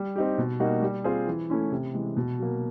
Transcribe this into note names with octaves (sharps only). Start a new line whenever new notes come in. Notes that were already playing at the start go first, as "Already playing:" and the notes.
Already playing: G3
C4 D#4 G4
B2
G3 A#3 D#4 F#4
G3
C4 F4 G#4 C5
E3
A3 C#4 E4
C3
E3 G#3
B2
F#3 A#3